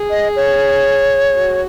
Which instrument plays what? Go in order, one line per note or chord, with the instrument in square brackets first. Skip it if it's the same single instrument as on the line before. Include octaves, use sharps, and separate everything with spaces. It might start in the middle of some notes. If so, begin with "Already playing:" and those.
Already playing: [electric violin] G#4
[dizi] D#5
C#5
[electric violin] F#4